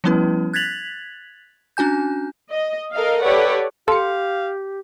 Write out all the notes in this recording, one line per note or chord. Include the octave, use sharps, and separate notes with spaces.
F3 G3 B3 C#4 E4 B4
F#6 G#6 A6 B6 F7 F#7
C#4 D4 F#4 G#5 G6
D#5
A4 A#4 D#5 F5
G4 A4 B4 C#5 D5 F#5
G4 A4 F5 C6 C#7